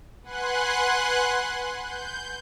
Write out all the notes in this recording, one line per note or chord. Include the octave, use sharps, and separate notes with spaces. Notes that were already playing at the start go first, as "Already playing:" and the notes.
B4 F#5 G#5 C6 F#6
G6